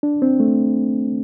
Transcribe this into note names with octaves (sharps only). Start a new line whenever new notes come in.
D4
C4
A3